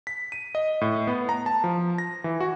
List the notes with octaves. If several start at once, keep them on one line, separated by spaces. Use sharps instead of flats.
B6
D#7
D#5
A2
B3
A#5
A5
F3
A#6
E3
F#4